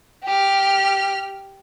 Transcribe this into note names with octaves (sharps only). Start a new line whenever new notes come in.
G4 F6